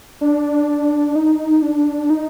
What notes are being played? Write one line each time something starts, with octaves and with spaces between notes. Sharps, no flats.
D4
D#4
D4
D#4